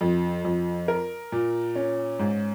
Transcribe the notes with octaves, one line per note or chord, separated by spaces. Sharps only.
F2
F2
A#4
A#2
C#4
G#2